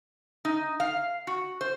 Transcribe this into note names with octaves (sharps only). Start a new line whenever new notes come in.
D#4
F5
F#4
C5